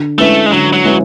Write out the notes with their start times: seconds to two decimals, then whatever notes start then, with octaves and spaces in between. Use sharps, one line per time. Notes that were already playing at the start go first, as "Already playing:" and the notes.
Already playing: D3
0.18 G#3 A3 C#4 E4 B4
0.46 G#3
0.52 D3 F#3
0.73 F#3
0.85 G#3 C#4 E4 B4